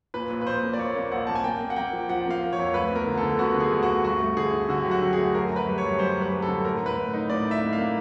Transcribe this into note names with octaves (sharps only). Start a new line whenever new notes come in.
A#2 B4
A#1
B4
A#1 C5
A#3
D5
A#1 C#5
A#3
A#1 F#5
A#3 A5
G#5
A#3 G5
A#3
F#5
A#3 G5
F3
F3 F#5
A#3
F5
A#3
C#5
F2
D2 B4
B3 A#4
D3
A4
D3
B3 F#4
D3
G#4
D2
F#4
D2
G2 F#4
A3
D3 G#4
D3
D3 F#4
F#3 G4
F#4
D3
G#4
A3
F#2 A#4
F#2
B4
G3
C#5
F#2
G3 C5
F#2
B4
G3
A4
D3
A2 A#4
A2 B4
A2
D#4
A2 D5
D#4
E5
A#3
F5
A#3